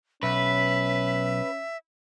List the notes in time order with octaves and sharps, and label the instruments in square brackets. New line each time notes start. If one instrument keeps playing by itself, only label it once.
[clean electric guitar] B1 [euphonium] C#4 [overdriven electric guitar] B4 [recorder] E5